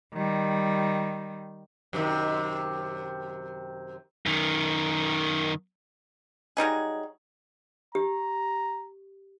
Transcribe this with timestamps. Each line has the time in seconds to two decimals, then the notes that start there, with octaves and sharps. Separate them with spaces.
0.14 D#3 G3
1.93 F#2 C3 D#3
4.26 F#2 D#3
6.57 F#3 G3 D#4 G#4
7.95 G4 A#5